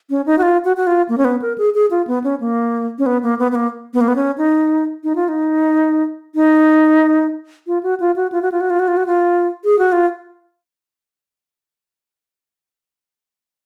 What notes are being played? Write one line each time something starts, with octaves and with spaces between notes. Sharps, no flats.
C#4
D#4
F#4
F4
F#4
F#4
F4
A#3
C#4
B3
A#4
G#4
G#4
F4
B3
C#4
A#3
C#4
B3
A#3
B3
B3
A#3
B3
A#3
B3
C#4
D#4
D#4
F4
D#4
D#4
F4
F#4
F4
F#4
F4
F#4
F4
F#4
F4
F#4
F4
F#4
F4
G#4
F#4
F4